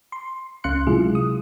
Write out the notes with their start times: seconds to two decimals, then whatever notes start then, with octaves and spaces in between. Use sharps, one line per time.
0.12 C6
0.64 C#2 C#4 F5 C6 F#6 C#7
0.87 C3 F#3 G#3 E4 F4 G#4
1.15 D#6